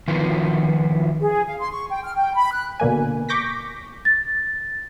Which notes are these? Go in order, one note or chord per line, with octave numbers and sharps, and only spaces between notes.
D#3 F3 B3 F4
G#4
F5
C6
C#6
G5
F6
G5
B5
F#6
B2 D3 A#3 G#5
C#6 D6 G6 A#6 B6
A6